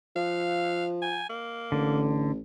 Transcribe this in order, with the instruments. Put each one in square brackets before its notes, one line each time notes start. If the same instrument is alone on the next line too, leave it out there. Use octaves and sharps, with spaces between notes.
[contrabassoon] F3 [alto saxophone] F5
[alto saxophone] G#5
A#3
[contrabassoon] A1 [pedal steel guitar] D3